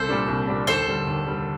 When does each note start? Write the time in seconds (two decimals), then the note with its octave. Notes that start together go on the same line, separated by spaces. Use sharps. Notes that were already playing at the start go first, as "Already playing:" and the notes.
Already playing: C2 A4 C5
0.09 A#2 G3 D4
0.28 C2
0.47 A#2 G3 D4
0.67 D#2 A4 C5
0.87 D3 G3
1.07 D#2
1.27 D3 G3